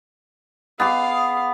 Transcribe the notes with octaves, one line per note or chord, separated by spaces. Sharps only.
B3 G#4 F5 D6